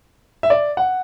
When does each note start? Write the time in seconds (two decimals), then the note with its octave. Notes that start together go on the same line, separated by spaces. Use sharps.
0.43 E5
0.50 D5
0.77 F#5